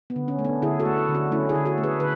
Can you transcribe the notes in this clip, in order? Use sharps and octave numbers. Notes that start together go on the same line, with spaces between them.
B3
D3
C#4
A3
B3 D4
D3 E4 G#4
F#4 A4
A3
D3
D4 F#4
A3 C#4 E4
E4 G#4
D3
F#4 A4
A3
G#4 B4
D3 B4